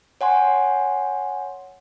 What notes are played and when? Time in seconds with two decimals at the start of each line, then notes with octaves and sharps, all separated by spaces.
0.21 C#5 F#5 G#5 C6